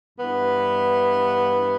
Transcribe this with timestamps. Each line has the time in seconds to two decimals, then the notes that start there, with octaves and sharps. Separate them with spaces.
0.17 G2 E3 B3